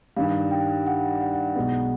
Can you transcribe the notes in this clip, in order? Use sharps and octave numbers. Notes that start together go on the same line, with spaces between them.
G2 D#3 G3 F5
G5
F#5
F#5
B1 B2 G#3 B3 F#5